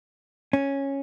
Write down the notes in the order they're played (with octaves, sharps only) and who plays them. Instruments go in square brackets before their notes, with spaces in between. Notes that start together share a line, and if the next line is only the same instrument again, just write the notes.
[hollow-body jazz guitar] C#4